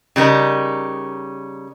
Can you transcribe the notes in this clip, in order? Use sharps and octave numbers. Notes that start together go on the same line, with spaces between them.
C#3 G3 D#4 A#4